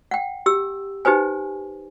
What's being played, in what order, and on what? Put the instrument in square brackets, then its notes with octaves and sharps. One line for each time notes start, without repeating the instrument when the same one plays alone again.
[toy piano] F#5 G5
G4 E6
D#4 G4 B4 C5 G#5